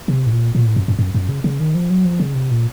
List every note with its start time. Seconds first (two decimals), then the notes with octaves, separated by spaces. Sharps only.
0.08 C3
0.26 A2
0.31 A#2
0.55 A#2
0.66 A2
0.76 F#2
0.88 F#2
0.99 F#2
1.15 F#2
1.29 C#3
1.44 C#3
1.60 D#3
1.75 F3
1.90 F#3
2.05 F3
2.20 C#3
2.35 C3
2.51 A#2